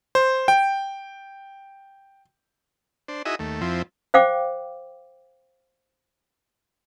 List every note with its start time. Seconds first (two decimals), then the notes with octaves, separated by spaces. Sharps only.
0.15 C5
0.48 G5
3.08 D4 C5
3.25 D#4 E4 F#4 G#4 D#5 E5
3.39 D#2 A3
3.61 F2 F3 C4 E4
4.14 C5 F5 G5 D6